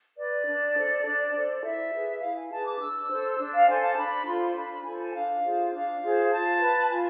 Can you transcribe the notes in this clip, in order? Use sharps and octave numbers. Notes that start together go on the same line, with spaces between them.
B4 D5
D4
A4 C5
D4
A4 C5
E4 E5
G#4 B4
E4 F5
G#5
G#4 B4 A5
D6
D4 E6
A4 C5
D4
F5
A4 C5 G#5
A5
D4 B5
F4 A4 C5 C6
D4 B5
F4 A4 C5 G#5
D4 F5
F4 G#4 C5
D4 F5
F4 G#4 C5
F4 A5
B4
F4 G#5